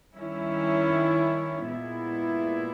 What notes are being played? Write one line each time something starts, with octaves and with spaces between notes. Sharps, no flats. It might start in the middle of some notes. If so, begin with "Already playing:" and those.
D#3 G3 C#4 E4
A#2 G#3 B3 E4